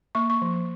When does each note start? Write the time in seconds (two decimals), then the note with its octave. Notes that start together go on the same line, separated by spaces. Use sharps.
0.15 A#3 C#6
0.30 C#6
0.42 F3